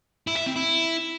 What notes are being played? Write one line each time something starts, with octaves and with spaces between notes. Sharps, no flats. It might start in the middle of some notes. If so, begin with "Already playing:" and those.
E4
E5
C4
E4